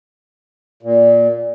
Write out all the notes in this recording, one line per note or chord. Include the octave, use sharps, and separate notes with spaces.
A#2